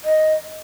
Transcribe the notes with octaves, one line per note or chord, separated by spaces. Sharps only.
D#5